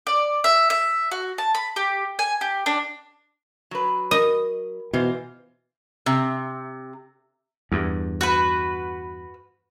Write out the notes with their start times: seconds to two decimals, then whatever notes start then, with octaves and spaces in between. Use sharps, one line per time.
0.07 D5
0.44 E5
0.70 E5
1.11 F#4
1.38 A5
1.55 B5
1.76 G4
2.19 G#5
2.41 G4
2.66 D4
3.71 F#3 B4
4.11 A#4 D#5
4.93 B2 E3 F4 C5
6.06 C3
7.72 E2 G2
8.21 F#4 B4